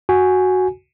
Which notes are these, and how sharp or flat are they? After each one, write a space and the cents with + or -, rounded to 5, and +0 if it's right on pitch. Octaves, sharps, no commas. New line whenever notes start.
F#4 +0 G#5 +0